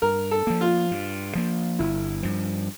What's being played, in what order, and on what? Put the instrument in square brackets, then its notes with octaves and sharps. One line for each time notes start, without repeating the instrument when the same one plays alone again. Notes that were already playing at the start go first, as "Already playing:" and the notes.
[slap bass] G2 [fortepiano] A#4
[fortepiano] A4
[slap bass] F3 A#3
[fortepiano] F4
[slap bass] G2
F3 A#3
[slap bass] G1 [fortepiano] E4
[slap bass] G2 F3